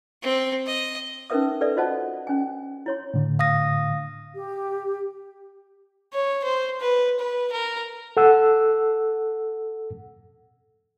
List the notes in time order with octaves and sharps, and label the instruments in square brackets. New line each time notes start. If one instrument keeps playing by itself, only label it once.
[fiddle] C4
D#5
[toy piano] C#4 D#4 A#4 B4 E5 D#6
A4 B4 D5 E5
F4 F#4 C5 D#5 F#5 A5
C#4 G#5
E4 C#5 C6
[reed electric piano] A2 D3
[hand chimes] F5 D#6 A#6
[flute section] G4
[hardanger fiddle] C#5
C5
B4
B4
A#4
[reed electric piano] A4 F#5 E6